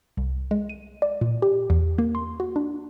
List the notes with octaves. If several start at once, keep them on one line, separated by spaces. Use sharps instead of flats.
C2
G#3
D#7
D5
A#2
G4
E2
A#3
C6
F#4
D4